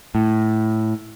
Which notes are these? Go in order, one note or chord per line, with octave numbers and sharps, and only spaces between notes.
A2